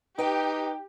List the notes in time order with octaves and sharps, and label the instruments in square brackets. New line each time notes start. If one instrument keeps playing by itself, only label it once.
[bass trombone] D#4 [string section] G4 [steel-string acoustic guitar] B4 G5